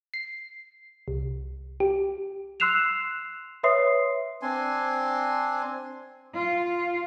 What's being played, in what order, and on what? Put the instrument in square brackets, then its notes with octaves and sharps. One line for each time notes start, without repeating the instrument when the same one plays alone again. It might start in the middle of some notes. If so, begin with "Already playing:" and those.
[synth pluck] C7
C2
G4
[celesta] C6 E6 F#6 C7 E7 F7
B4 C#5 E5 C6 D#6 C7
[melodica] C4 D4 G#5 C6
[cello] F4